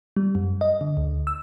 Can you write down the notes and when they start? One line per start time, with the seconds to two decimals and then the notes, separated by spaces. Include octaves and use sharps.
0.16 G3
0.35 F#2
0.61 D#5
0.81 D3
0.97 D2
1.27 E6